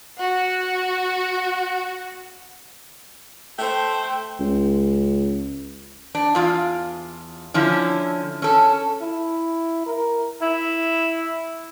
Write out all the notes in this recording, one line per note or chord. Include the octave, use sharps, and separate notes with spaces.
F#4 F#5
A3 A4 C5 G5
C#2
D4
E2 F4 F5
D3 F3 C#4 E4
C#4 A4
E4
A#4
E4